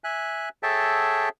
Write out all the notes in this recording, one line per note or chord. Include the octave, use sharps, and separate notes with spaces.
E5 G#5 F#6
G#4 A4 C#5 E5 G5 A5